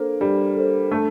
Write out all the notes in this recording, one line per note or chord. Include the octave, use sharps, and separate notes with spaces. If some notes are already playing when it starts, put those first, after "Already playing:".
Already playing: A#3 D4 A4 C5
G3 D4
A4 C5
A3 D4